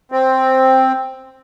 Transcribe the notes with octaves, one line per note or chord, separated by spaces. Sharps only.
C4